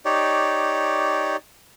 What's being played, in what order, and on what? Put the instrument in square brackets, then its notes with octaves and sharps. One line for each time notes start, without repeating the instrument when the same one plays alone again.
[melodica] D#4 G4 C#5 D5